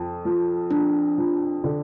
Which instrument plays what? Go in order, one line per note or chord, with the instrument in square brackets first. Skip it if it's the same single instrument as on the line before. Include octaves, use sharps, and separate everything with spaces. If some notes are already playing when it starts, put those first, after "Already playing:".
Already playing: [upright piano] F2 F3
F3
[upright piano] F3 [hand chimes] D4
[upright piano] F3
D3